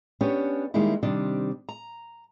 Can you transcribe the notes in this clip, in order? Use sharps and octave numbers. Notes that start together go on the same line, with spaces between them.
B3 C#4 D4 G4 C#5
D#3 G3 G#3 A#3 D#4 E4
C3 D#3 G3 C4 D4
A#5